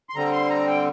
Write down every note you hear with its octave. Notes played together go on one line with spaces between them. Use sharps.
C6
D3 G3 C4 A#5
C6
A#5
G5